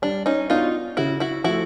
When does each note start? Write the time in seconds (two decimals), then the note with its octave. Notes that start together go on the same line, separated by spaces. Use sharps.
0.02 G3 D4
0.26 C#4 D#4
0.50 B3 D4 D#4 F4 F#4
0.97 C#3 E4 F#4
1.20 E4 F#4
1.44 F3 A3 E4 F#4